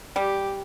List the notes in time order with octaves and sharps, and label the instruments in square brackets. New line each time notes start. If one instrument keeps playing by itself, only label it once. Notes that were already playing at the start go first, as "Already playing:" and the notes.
[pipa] G3 [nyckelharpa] G4